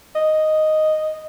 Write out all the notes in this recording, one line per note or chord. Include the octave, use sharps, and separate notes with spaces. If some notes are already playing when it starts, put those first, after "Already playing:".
D#5